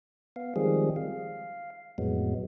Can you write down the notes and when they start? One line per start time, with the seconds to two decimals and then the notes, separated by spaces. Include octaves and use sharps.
0.36 B3 F5
0.56 D#3 F3 G3 G#3 C4 G#4
0.96 F5
1.98 F2 A2 F#3 G#3 B3